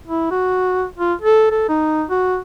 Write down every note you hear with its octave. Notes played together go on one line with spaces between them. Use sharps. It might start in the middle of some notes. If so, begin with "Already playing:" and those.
E4
F#4
F4
A4
A4
D#4
F#4